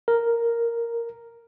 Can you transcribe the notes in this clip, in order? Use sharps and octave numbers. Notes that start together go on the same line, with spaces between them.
A#4